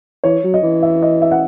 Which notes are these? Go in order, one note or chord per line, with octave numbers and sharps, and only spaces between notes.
E3 C#5
F#3
D#5
E3
E5
D#5
E5
F#5